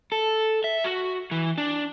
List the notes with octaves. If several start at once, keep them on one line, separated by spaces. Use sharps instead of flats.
A4
E5
F#4
E3
D4